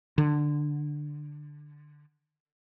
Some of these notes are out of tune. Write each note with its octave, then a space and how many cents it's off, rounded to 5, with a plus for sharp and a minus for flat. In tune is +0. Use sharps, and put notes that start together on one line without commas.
D3 +10